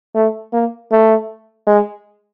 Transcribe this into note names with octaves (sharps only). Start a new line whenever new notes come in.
A3
A#3
A3
G#3